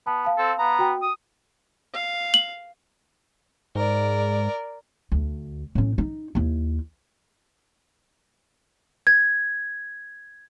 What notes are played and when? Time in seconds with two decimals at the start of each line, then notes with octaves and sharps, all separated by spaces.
0.07 B3 A5
0.25 F5 A5
0.38 C4 A4
0.59 B3 A#5
0.79 F#4 G5
1.02 D#6
1.94 F5
2.34 F#7
3.75 G#2 A#4 D5
5.12 D2
5.75 A2 C#4
5.98 D#4
6.35 D#2 E4
9.07 G#6